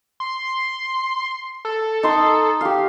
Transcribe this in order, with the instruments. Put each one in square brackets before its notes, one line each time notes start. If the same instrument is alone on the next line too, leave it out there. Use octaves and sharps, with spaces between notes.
[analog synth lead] C6
A4
[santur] D#4 C6 D#6
G4 F5